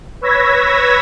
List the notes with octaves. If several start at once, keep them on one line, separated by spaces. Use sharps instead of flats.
B4 C#5 E6 G#6 A#6 B6